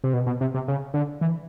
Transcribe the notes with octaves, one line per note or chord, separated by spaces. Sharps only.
C3
B2
B2
C3
C3
C#3
D3
E3